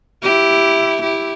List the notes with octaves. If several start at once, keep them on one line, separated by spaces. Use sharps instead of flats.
E4 G4
E4 G4